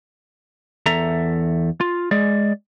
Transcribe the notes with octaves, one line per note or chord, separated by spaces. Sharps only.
E2 A4 E5 A#5
F4
G#3 G#4 D5